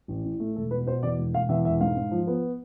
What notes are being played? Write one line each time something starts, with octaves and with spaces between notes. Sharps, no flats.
A1
A2
A3
E1 A4
B2 B4
B2 C5
E2 D5
E1
E1 F5
E2 E5
E1 E5
G#2 F5
G#2
F3
B3